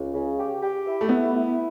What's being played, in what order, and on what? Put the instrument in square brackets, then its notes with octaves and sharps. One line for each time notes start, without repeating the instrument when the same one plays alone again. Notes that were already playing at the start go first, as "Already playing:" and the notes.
Already playing: [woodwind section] C#2
C#3
G4
G4
E4
[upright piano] A3
[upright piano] B3 [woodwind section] E4
[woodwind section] E4